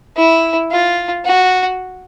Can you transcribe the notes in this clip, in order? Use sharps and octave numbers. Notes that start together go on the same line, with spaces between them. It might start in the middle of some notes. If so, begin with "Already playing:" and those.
E4
F4
F#4